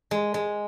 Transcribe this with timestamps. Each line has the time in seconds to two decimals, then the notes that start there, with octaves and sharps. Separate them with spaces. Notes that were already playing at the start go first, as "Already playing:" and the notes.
0.11 G#3
0.34 G#3